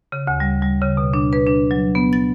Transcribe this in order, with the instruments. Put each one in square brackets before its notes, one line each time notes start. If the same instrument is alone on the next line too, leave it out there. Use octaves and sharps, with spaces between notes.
[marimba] C#3
D2
G3
G3
C#3
B2
D4
B4
D4
F#3
B3
A6